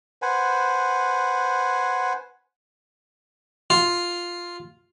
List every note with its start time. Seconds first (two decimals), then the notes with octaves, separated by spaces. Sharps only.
0.22 B4 C5 F#5 G#5
3.70 F4